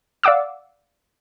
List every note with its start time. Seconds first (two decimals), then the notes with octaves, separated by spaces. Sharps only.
0.23 D5 F5 F#5 D6 E6